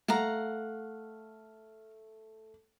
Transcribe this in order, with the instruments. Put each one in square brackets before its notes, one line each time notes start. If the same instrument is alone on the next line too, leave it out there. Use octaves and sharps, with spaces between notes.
[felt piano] A3 [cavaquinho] F5 F#5 A#5